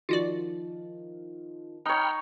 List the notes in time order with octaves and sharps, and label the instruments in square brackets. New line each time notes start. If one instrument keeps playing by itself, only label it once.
[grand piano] D#3 F3 [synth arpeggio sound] F4 F#4 D5
[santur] D#4 C#5 [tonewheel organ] G5 B5 F6